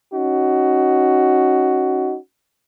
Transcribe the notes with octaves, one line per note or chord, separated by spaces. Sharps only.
C#4 D#4 F#4